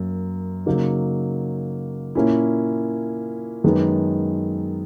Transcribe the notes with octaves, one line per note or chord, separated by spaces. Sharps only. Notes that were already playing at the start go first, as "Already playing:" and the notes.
Already playing: F#2 A#3
C#3 F#3 A#3 D#4
A#2 A#3 C#4 E4
F#2 D#3 G#3 B3